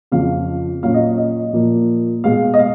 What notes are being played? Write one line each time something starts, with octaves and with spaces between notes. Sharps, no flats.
F2 C#3 F3 F5
A#2 F#3 C#4 F5
D#5
D#5
A#2 F3 A#3
B2 G#3 B3 F5
D#5
F5